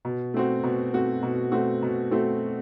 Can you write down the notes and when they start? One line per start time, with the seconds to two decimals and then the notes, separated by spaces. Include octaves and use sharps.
0.05 B2
0.34 A3 C4 F#4
0.63 B2
0.93 A3 C4 F#4
1.23 B2
1.52 A3 C4 F#4
1.82 B2
2.11 A3 C4 F#4